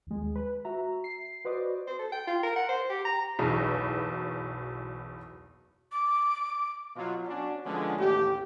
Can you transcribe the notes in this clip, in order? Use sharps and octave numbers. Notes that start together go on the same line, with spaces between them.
D#2 G#3
B4
F#4 E5 A#5
C7
F#4 B4 C5 D5 D#5 D6
C5
A4
G5
F4
A#4
F#5
C5
G4
A#5
F#1 B1 E2 B2
D6
B2 F#3 F4
C#4 D4 F#4
D3 F3 G#3 B3 C#4 D4
A1 D#2 A3 G4